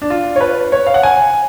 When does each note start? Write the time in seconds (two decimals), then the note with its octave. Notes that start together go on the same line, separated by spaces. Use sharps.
0.02 D4
0.10 F4
0.36 C#5
0.41 B4
0.72 C#5
0.86 F5
0.94 F#5
1.03 G#5